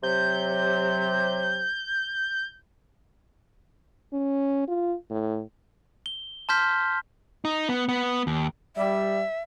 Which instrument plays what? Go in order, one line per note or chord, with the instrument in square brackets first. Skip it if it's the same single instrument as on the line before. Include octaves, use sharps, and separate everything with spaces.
[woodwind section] C3 F#3 [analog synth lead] G6
[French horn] C#4
F4
A2
[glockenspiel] G7
A5 C6 F6 G6 B6
[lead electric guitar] D#4
B3
B3
D#2
[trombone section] G3 [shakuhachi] E5